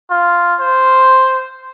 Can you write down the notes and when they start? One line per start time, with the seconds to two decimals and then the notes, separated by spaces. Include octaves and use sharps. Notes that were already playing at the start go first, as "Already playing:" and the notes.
0.10 F4
0.60 C5